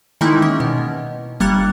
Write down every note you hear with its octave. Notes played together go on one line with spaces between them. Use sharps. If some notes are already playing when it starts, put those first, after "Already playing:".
D#3 E3 G#3 A#3 D#4 E4
A#3 C#4
B2
G1 G3 A#3 F#6 A6 C#7